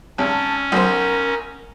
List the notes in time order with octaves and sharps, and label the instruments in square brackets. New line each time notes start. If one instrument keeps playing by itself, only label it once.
[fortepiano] G#1 [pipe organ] C#4 [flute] A5
[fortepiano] B1 C5 [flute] A#4